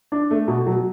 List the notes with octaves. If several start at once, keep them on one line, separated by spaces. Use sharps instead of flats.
D4
A3
B2
F#3